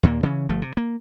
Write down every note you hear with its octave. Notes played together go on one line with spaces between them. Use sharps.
D#2 A#2 G3 A#3
C#3 E3 C#4
G1 F3 A3
C3
A#3